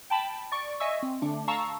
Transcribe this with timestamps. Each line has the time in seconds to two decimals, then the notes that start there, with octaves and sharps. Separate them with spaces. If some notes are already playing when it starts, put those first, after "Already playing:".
0.10 G5 A5 B5
0.52 D5 C#6
0.80 D#5 E5 G#5 C#6 E6
1.03 C4
1.22 D3 A3 D4
1.48 F5 A5 A#5 C#6 E6